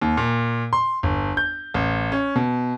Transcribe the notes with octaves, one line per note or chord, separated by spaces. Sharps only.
D#2
A#2
C6
G1
G6
A1
C#4
B2